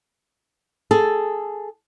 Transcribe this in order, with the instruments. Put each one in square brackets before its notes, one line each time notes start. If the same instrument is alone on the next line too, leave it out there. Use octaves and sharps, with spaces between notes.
[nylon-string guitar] G#4 A4